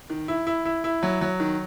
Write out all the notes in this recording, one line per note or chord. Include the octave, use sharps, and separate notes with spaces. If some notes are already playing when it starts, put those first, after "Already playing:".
D#3
E4
E4
E4
E4
F#3
F#3
D#3